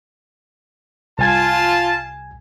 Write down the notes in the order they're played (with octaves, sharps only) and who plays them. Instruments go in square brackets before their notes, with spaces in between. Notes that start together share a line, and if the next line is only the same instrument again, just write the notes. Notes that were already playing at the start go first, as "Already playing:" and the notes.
[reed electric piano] C2 G#5 G#6 [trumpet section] F4 A5